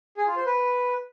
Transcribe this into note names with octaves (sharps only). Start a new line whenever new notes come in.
G#4
F4
C5
B4